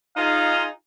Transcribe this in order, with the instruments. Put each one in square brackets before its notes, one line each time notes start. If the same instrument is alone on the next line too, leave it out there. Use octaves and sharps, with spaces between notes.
[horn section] D#4 F4 G#4 [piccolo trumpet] F5